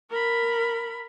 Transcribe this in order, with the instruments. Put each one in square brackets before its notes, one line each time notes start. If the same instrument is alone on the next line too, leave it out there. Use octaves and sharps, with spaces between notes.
[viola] A#4 B5